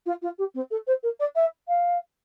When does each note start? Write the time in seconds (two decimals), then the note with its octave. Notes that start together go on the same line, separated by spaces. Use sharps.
0.06 F4
0.22 F4
0.38 G4
0.55 C4
0.71 A4
0.87 C5
1.03 A#4
1.20 D5
1.36 E5
1.68 F5